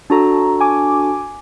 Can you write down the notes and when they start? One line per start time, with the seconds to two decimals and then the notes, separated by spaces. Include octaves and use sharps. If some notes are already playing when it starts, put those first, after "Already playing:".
0.10 D4 F#4 A4 A5 A#5
0.60 G#5 D6